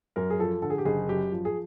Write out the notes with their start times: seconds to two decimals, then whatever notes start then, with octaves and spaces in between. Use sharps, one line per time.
0.16 F#2 A#4
0.30 G#4
0.39 F3 A4
0.62 D3 A4
0.70 G#4
0.78 G4
0.85 F#1 G#4
1.09 F#2 G4
1.32 F3
1.45 G#4